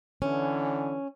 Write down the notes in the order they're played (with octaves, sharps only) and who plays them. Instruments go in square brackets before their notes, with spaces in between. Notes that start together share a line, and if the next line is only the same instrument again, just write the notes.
[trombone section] D3 E3 [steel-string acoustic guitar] C#4